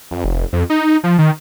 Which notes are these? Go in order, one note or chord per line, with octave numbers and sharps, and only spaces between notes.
F2
F1
F2
D#4
F3
D#3